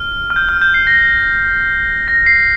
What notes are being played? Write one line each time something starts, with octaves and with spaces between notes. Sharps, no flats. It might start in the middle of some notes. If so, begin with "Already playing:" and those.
Already playing: F6
F6
G6
F6
G6
C7
A#6
A#6
C7